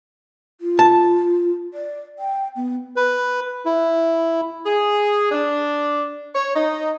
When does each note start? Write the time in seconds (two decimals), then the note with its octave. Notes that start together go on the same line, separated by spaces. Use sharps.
0.61 F4
0.79 A5
1.74 D5
2.19 G5
2.56 B3
2.96 B4
3.66 E4
4.66 G#4
5.32 D4
6.35 C#5
6.55 D#4